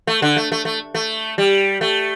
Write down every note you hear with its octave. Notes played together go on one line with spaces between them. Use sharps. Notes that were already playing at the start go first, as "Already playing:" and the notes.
A3
D3
A3
A3
A3
A3
G3
A3